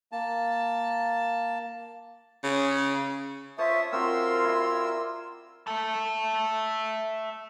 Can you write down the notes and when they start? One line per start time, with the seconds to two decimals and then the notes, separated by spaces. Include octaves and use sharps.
0.12 A#3 A5
2.44 C#3
3.58 F4 C5 C#5 E5 A5 C#6 D#6
3.92 C4 F4 F#4 A#4 C6 E6
4.44 E4 D5
5.67 E5 A5